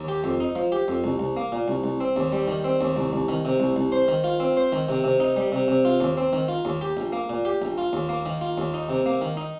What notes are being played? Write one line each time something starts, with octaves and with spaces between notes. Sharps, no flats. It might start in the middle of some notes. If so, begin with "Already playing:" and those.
Already playing: D#2
G4
F2
D#4
F3
G4
F2
C2
C2
A#3
A#2
C2
C2
C4
D#2
G3
D#3
C4
D#2
C2
C2
D#3
C3
C2
C2
C5
D#3
F4
C4
C5
D#3
C3
C3
D#4
G3
C3
C3
F4
D#2
C4
D#3
F4
D#2
G4
A#1
A#3
A#2
G4
A#1
F4
D#2
A#3
D#3
F4
D#2
D#4
C3
A#3
D#3
D#4